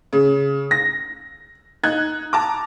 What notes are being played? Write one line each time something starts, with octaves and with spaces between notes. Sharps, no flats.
C#3
A#6
D#4 F#6 G#6
A5 A#5 D6